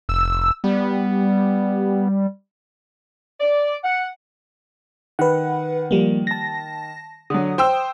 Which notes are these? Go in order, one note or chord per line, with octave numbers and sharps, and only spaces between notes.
F1 E6
G3 B3
D5
F#5
D#3 B4 F#5
F3 G3 A#3
A5 A#6
D3 F#3 D#6
C5 G5 E6